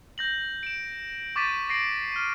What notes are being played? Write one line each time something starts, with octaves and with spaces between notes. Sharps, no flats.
G6 A#6 F#7
D7 E7
C#6 D6 G6 A6 B6 D#7
A#6 C7 D7 F#7
F6 D#7